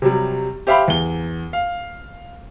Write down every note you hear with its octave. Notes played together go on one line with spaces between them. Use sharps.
C3 F#3 G3
G4 C5 E5 F5 G5 B5
E2 G7
F5